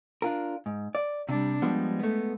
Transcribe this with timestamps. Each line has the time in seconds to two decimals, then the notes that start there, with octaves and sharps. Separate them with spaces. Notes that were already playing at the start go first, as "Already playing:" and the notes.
0.22 D4 F4 A#4
0.66 G#2
0.95 D5
1.29 C3 G3 D4
1.62 F3 G3 G#3 B3
1.99 A3 B3